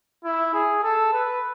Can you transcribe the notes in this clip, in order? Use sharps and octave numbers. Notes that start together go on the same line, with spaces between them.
E4
G#4
A4
B4